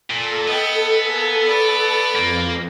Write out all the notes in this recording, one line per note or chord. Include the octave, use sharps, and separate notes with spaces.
A#2 A4
B3 D#5 G5
A#3 G#4
B4 D5
F2 A#3